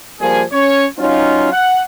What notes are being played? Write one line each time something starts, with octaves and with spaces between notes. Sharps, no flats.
F3 G3 A#3 G#4
C#4 C#5
F#3 C#4 D#4 F4
F#5